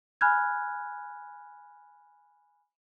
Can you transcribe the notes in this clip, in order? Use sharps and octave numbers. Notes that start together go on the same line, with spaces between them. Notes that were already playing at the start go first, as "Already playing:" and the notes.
G#5 B5 F6 F#6 G#6